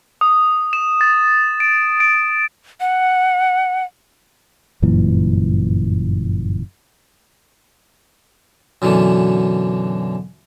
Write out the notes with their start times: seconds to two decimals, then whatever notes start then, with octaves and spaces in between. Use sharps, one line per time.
0.21 D#6
0.73 E7
1.01 A6
1.60 D7
2.00 D7
2.80 F#5
4.82 G1 F#2 A#2 E3
8.82 F#2 B2 D3 E3